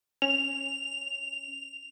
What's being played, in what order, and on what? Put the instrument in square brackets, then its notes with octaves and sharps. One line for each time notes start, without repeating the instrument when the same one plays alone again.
[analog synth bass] C#4 [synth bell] F7